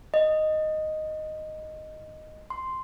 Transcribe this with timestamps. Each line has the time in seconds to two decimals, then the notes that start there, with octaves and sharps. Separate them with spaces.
0.14 D#5
2.50 C6